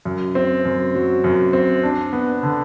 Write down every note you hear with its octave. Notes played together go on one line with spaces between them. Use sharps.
F#2
C4
F#2
F#3
F#2
C4
D4
B3
D3